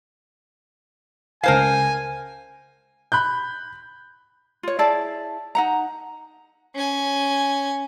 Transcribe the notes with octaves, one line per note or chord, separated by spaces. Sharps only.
C#2 A#4 C5 F5 G#5 A5 C7
B5 F#6 G6
F4 C#5
E4 G#4 D5 A5
D#4 F#5 A#5
C#4 G#5